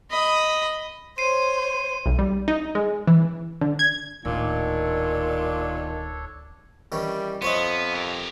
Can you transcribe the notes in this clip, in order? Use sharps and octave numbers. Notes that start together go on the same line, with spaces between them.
D#5 B5
C5 C#5 C7 D#7
B1
G3
D#4
G#3
E3
D3
G#6
D1 A#2 D#3 D4 A4 C#5
D#3 E3 G3 C#4
F2 B3 C5 C#5 D#5
G4 A#4